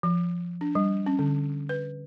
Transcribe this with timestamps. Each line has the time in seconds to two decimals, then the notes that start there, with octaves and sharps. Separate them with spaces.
0.03 F3
0.61 D4
0.75 G3
1.06 C#4
1.19 D3
1.69 B4